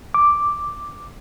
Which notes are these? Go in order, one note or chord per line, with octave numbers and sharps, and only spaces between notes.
D6